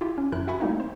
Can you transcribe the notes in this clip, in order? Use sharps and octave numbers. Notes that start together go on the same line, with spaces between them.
E4 F4 G4
C#4
G1 F#2 E4 A#4 F#6
F#4 E5 F#5 G#5 B5 C#6
G3 A3 A#3 C4 D#4 E4
C5